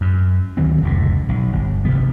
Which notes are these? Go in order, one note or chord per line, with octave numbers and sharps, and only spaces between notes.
F#2
D2 D#3 F#3 C4
F1 C#2 A2
B1
G1
D2 C3 G#3 B3